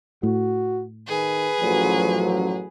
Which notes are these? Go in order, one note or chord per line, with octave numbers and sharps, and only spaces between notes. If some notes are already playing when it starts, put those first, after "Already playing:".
A2 F#4
D#3 G#4 B4
A1 F#2 F3 F#3